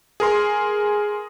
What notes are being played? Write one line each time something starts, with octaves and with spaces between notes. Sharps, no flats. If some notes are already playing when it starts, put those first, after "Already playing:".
G#4 A#4 C6